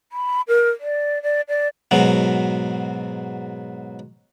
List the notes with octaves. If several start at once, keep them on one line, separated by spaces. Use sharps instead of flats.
B5
A#4
D5
D5
D5
G#2 B2 F#3